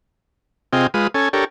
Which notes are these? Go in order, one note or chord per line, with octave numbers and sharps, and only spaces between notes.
C3 C4 F4 G#4 D#5 G5
G#3 F4 B4 D#6
C#4 A4 G#5
D4 G4 A4 A#4 C#5